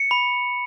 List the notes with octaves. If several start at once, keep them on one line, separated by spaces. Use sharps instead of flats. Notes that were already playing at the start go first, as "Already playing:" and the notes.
Already playing: C#7
B5